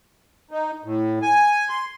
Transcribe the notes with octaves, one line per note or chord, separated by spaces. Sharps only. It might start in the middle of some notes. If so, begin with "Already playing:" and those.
D#4
A2
G#5
C6